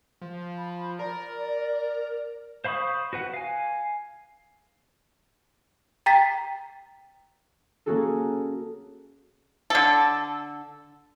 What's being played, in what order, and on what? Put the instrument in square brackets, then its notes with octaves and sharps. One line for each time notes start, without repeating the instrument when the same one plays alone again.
[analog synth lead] F3
[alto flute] B5
[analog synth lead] A#4 [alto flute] D5
[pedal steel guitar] C5 F5 B5 C#6 D#6
F#4 B4 F#5
F5 G#5
[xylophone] G5 A#5 A6 B6
[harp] A#3 C#4 F#4 G#4 A4
[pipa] D3 A4